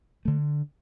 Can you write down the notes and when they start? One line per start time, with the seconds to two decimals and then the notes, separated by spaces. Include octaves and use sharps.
0.25 D3 A3